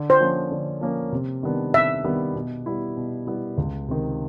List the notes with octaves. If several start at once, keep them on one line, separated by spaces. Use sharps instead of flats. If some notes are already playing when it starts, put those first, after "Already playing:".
Already playing: D3
C5
F3 A#3 C#4
D3
F3 A#3 C#4
C3
D#3 G3 B3 D4
C3 E5
D#3 G3 B3 D4
B2
G3 B3 E4
B2
G3 B3 E4
C#2
C3 D#3